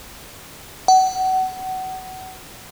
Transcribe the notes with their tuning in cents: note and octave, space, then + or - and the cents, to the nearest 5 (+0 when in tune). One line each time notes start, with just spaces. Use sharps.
F#5 +25